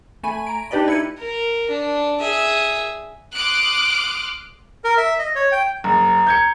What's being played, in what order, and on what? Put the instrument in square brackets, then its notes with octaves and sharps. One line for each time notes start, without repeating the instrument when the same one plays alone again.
[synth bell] A3 G#5 B5 D#7
A#5 D7
D4 D#4 G4 B4 D5 D#5
E4 C#7 D#7
[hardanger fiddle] A#4
D4
G#4 E5
[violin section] C6 D6 D#6 F6 F#6 D7
[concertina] A#4
E5
D#5
C#5
G5
[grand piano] F#1 [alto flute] A#5
[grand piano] G6 G#6 C#7